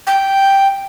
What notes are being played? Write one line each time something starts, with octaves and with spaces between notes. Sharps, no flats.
G5